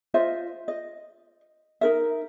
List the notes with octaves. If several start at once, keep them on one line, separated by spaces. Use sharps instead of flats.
F4 C5 D#5 E5
D#5
D#4 A#4 E5